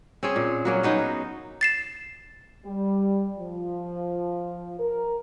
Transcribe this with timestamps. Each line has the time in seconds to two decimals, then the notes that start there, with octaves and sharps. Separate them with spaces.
0.23 C4 C#4 G#4
0.36 A#2
0.65 F#3 A#3 C#4
0.83 F#3 B3 D#4 G#4
1.61 A6 C7 E7
2.65 G3
3.39 F3
4.79 A#4